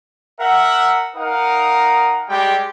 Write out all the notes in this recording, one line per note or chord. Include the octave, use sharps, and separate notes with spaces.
A#4 E5 F#5
D#4 A#4 F5 F#5 D#6
G3 G#3 G4 G5